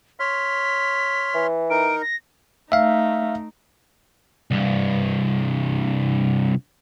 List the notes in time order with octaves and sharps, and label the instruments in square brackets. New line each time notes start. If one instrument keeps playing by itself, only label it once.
[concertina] C#5 C6 F6 [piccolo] B6
[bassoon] E3
[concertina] D#4 A#4 [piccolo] D7
[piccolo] A#6
[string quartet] A3 D#4 [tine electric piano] E5 F5
[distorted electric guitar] C2 G2